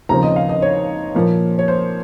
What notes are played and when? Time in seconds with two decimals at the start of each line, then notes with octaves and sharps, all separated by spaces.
0.09 D#2 C#3 F3 C4 A#5
0.23 D#5
0.36 F5
0.49 D#5
0.62 C#5
1.15 A#2 F3 A#3
1.59 C#5
1.68 C5